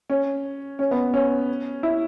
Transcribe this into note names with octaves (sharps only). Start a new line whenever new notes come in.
C#4
C#4
B3
C#4
E4